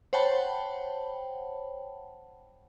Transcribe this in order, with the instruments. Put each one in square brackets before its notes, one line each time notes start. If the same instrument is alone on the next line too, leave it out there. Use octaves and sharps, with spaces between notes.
[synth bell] C5 C#5 F#5 G5 A5 B5